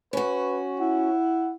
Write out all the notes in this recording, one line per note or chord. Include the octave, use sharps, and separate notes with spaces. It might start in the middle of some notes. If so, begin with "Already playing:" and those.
C#4 F#4 B4
E4 F#5